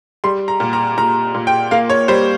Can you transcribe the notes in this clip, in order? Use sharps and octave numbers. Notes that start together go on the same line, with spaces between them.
G3 C6
A#5
A#2
A#5
A#2 A#5
A#2
G5
A#3 F5
C#5
G3 C5